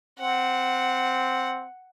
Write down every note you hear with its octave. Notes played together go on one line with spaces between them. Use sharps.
C4 F#5